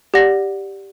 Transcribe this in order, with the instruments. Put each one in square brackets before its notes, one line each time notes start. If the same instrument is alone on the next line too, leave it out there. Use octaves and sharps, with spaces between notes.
[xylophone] G4 D5 F#5 A#6